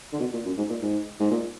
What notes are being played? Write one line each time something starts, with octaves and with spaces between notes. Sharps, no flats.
D3
B2
A#2
F#2
G#2
A#2
G#2
G#2
A#2